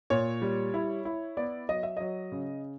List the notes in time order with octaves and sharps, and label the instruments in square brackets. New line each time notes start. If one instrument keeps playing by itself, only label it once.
[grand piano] A#2 C#5
G3
E4
E4
B3 D5
F#3 D#5
E5
F#3 D#5
C#3